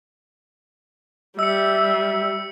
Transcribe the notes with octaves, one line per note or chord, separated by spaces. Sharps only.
G3 E5 E6 C#7